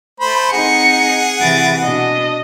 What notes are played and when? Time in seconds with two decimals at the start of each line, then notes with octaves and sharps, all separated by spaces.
0.20 A3 C5 B5
0.52 C4 D#4 G#4 F#5 C#7
1.41 C3 E3 A6 D7
1.84 B2 D4 D#5